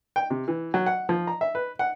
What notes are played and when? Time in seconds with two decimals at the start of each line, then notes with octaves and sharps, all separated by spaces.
0.16 G5
0.30 C3
0.48 E3
0.74 F#3
0.86 F#5
1.09 F3
1.27 A#5
1.41 E5
1.55 B4
1.79 F#5